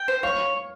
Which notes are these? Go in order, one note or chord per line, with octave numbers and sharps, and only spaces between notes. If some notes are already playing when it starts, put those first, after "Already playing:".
Already playing: G5
C5
C#5 F5